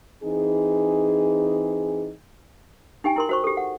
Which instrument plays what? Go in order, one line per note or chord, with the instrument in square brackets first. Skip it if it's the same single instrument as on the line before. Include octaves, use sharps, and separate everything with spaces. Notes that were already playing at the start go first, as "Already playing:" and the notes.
[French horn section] E3 C4 D#4 G#4
[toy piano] D#4 G4 G5 G#5
E4 A#4 C6
F#4 C5 C#6
G4 A4
F#5